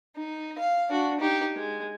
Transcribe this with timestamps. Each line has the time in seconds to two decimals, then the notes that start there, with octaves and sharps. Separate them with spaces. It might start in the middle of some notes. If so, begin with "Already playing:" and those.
0.16 D#4
0.58 F5
0.89 D4 F#4
1.19 D#4 G4
1.56 G#3